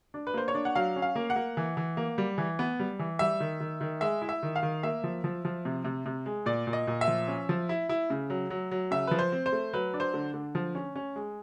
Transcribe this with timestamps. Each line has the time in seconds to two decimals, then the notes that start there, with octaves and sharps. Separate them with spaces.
0.14 D4
0.27 B4
0.34 A#3 C5
0.48 C#5
0.54 D4
0.65 F#5
0.75 F#3 F5
0.96 C#4
1.02 F5
1.15 A#3
1.30 F#5
1.36 A#3
1.57 E3
1.77 E3
1.97 A#3
2.18 G3
2.38 E3
2.59 B3
2.80 G3
2.99 E3
3.19 G3 E5
3.40 D#3
3.60 D#3
3.81 D#3
4.01 G#3 E5
4.22 E4
4.29 E5
4.43 D#3
4.56 F5
4.63 D#3
4.83 A#3 E5
5.04 F3
5.24 F3
5.45 F3
5.65 C3
5.85 C3
6.06 C3
6.26 G#3
6.46 A#2 D5
6.67 A#2
6.73 D#5
6.87 A#2
7.01 E5
7.08 F3
7.28 C#4
7.49 F3
7.69 E4
7.89 E4
8.10 C#3
8.30 F#3
8.50 F#3
8.71 F#3
8.91 C#3 E5
9.07 F3 B4
9.19 C5
9.32 C4
9.46 C5
9.52 A3
9.73 F#3 B4
9.94 D4
10.00 C5
10.14 D3
10.34 D3
10.55 F3
10.75 C#4
10.96 C#4
11.16 G#3